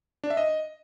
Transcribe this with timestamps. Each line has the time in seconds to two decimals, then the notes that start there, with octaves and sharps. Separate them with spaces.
0.24 D4
0.30 E5
0.37 D#5